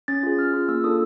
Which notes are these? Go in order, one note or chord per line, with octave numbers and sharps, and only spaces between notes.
C#4 A6
F4 G#4
C#4 F6
F4 G#4
A#3 E6
D4 F4 A4 D#6